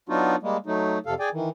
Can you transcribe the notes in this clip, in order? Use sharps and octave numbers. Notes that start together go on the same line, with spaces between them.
F#3 B3 D4 D#4 F4 F#4
G3 G#3 A#3
F#3 A3 D#4
F2 C3 A4 F5
G#4 D5 G5 G#5
D#3 E3